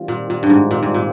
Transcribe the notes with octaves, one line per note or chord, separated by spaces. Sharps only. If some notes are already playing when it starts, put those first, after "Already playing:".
Already playing: D#3 G3 C4 F4
A#2
A#2
G2
G#2
A#2
G#2
A#2